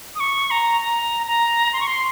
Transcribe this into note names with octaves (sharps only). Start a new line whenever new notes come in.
D#6
C#6
A#5
A#5
A#5
C6
C#6
C6